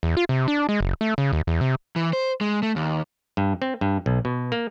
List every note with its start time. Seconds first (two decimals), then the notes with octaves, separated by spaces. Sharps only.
0.03 E2
0.17 F4
0.29 C3
0.48 D4
0.69 G#3
0.80 F#1
1.01 A3
1.18 C#3
1.33 D#2
1.47 E2
1.61 C3
1.96 E3
2.13 C5
2.41 G#3
2.63 A3
2.76 D#2
3.37 G2
3.62 C4
3.81 G2
4.06 B1
4.25 B2
4.52 A#3